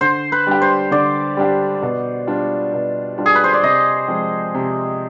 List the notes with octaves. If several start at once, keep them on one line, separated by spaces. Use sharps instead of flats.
D3 C5
B4
G3 D4 G4
C5
D3 D5
G3 D4 G4
B2
G3 D4 F4
B2
G3 D4 F4
G#4
B4
C5
D5
C3 D#5
F3 G#3 C4
C3